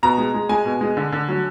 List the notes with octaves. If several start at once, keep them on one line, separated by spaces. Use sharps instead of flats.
B2 A#5
G#3
G#3
G#3 G#5
B2
G#3
D3
D3
F#3